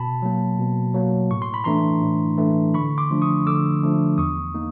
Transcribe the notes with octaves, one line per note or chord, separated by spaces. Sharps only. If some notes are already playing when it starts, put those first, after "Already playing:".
Already playing: B2 A5 B5
F#3 A#3
B2
F#3 A#3
A2 C#6
C6
B5
E3 A3 D4 A#5 C6
A2
E3 A3 D4
D3 B5 C#6
C6 D6
F3 A3 D4
C#6 D#6
D3 D6 E6
F3 A3 D4
E2 C#6 D#6
A#3 D#4